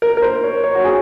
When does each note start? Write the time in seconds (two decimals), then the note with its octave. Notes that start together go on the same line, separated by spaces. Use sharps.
0.02 A#4
0.17 A#4
0.22 C5
0.43 C#5
0.64 C#5
0.75 F#4
0.85 G#4